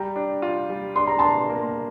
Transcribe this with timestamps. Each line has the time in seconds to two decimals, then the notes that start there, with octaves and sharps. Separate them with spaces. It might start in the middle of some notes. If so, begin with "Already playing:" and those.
Already playing: G3 G5 A#5
0.16 D4
0.42 F4
0.70 G3
0.96 D4 C6
1.07 A#5
1.19 D4 A5 C6
1.50 A#3